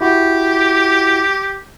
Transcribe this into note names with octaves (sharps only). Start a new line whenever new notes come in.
E4 F#4 G4